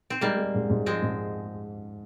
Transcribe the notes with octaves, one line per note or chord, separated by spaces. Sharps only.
C4
G3 G#3 A#3
G#3
G#2
G#2
F3 G#3 C4
G#2